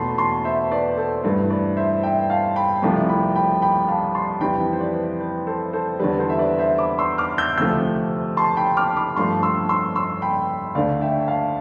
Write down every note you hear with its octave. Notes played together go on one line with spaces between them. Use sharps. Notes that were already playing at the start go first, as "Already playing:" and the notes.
Already playing: E2 B2 A3 A5 B5 C6
A5 C6
C5 E5
B4 D5
A4 C5
G2 E3 A3 B4
B4 D5
C5 E5
E5 G5
F5 A5
G5 B5
C2 C3 F3 A3
G5 B5
G5 B5
G5 B5
F5 A5
A5 C6
F2 E3 G3 G5 B5
C5
B4 D5
B4
A4 C5
A4 C5
E2 D3 G3 B4
A4 C5
E5
B4 D5
C5 E5
B5 D6
C6 E6
D6 F6
E6 G6
D2 C3 F3 A3 E6 G6
A5 C6
G5 B5
D6 F6
B5 D6
G2 F3 A3 A5 C6
C6 E6
C6 E6
C6 E6
G5 B5
D2 D3 A3 D5 F5
E5 G5
F5 A5